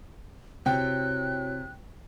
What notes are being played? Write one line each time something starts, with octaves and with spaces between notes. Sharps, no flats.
C3 E4 F#4 C#5 G5 F#6